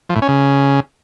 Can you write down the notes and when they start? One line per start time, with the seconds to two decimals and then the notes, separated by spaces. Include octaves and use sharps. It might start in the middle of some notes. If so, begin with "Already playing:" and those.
0.09 F3
0.16 A2
0.22 C#4
0.28 C#3